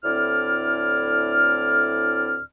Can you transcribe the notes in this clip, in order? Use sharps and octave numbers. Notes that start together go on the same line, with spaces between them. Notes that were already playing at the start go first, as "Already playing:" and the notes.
D2 A2 C4 E4 D5 F6